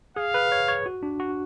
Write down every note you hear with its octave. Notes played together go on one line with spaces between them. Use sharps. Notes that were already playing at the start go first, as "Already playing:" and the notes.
G#4 F5
B4
C#5
C#5
F#4
D4
F#4